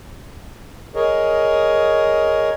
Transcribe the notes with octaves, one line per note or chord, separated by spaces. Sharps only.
G#4 A#4 C#5 D#5